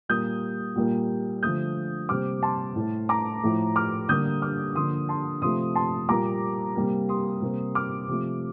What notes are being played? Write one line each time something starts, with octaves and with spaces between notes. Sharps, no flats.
A#2 G3 A#3 D#6 G6
A#2 G3 A#3
D3 F3 A3 D#6 G6
C3 G3 A#3 D6 F6
A5 C6
A2 A3
A#5 D6
A2 F3 A3
D6 F6
D3 G3 A#3 D#6 G6
D6 F6
D3 F3 A#3 C6 D#6
A5 C6
C3 F3 A3 C6 D#6
A5 C6
A#2 G3 A#3 A#5 D6
C3 G3 A#3
C6 D#6
C3 G3 A#3
D6 F6
C3 F3 A3